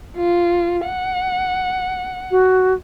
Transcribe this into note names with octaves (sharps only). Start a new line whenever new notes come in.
F4
F#5
F#4